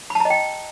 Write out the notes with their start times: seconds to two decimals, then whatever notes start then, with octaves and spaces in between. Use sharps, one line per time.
0.10 B5
0.15 A5
0.20 A#5
0.25 D#5
0.30 G5